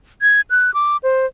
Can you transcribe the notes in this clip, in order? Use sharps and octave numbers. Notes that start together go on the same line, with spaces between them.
G#6
F#6
D6
C5